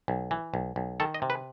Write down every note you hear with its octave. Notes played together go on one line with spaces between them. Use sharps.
B1
E3
B1
B1
D#3 A4
D#5
C3
B4